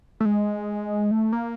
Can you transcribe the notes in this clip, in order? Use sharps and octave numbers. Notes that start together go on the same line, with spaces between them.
A3
G#3
A3
A#3